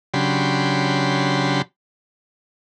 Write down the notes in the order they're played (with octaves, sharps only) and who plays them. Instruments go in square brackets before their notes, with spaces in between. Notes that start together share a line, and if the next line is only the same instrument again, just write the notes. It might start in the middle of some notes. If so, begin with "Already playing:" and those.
[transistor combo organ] C#3 F#3 D4 G4 B5 C6